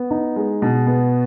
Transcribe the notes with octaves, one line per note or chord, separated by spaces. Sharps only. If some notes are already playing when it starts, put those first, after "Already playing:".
Already playing: B3
D#4
G#3
B2
B3